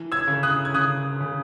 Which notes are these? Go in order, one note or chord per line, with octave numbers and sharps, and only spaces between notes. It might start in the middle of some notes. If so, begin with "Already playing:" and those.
Already playing: E3
E6 G#6
C#3
D#6 F#6
G#6
C#3 D#6 F#6
C#3